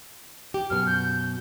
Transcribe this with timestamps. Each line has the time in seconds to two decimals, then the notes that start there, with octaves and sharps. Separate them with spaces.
0.54 G4
0.70 F#2 B2 F6
0.87 G6